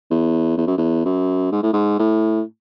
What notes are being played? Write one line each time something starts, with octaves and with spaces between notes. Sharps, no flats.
E2
E2
F#2
E2
F#2
G#2
A2
G#2
A2